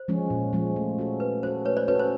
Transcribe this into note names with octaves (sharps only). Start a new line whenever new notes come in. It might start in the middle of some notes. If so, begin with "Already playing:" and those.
Already playing: C5
F3 G#3 C#4
A#2
F3 G#3 C#4
A3
C#4 F#4 A4
A3 B4
C#4 F#4 A4 C5
A3 B4 C#5
C5 D5
C#4 F#4 A4 B4 C#5
C5